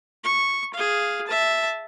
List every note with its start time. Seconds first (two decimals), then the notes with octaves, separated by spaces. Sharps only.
0.24 C#6
0.74 G#4 F5
1.27 E5 A5